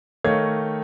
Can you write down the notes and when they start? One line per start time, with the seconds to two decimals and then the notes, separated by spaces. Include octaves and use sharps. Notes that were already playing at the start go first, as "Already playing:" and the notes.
0.24 D#3 A3 C#5 D#5 F5 G#6